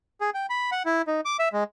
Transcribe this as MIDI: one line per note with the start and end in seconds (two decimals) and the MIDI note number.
0.21 0.30 68
0.34 0.46 79
0.50 0.70 83
0.72 0.83 78
0.86 1.02 64
1.07 1.21 63
1.25 1.37 86
1.39 1.49 76
1.53 1.64 56